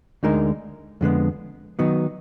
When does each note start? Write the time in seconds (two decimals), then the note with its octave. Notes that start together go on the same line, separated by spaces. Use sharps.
0.23 D2 D3 G#3 D#4 A#4
1.01 F2 D3 G#3 B3
1.79 D#3 F#3 B3 D#4